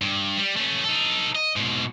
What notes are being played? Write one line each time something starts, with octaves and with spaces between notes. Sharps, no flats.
G2
G3
A3 C#4
D#4 A4
D#5
G#2 B2